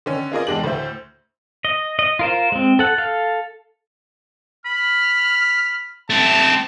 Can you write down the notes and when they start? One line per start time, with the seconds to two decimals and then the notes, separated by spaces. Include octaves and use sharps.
0.06 D3 D#3 C#4
0.32 D#4 F4 G#4 A#4 D5 D#5
0.47 E2 G#3 D4 G4 F#7
0.64 D2 A2 C5 E5 G6
1.65 D#5
1.99 D#5
2.19 F4 A#4 C5
2.52 G#3 C4
2.79 A4 F#5
2.98 A4 F5
4.66 B5 F6
6.10 A3 C4 A5